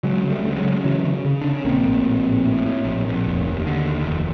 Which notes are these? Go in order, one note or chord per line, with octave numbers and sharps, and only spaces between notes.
C#3 F#3 G#3
C#3
G3 A3
D2
F#3 G#3
C#3
C#3 E3 F#3
C#3
C#3
C#3 D4
C#4
A#1 A#3 C4
A2
A#1
A#1
A2
A2
A#1
A#1
F1
D#2
D3
D#2
F1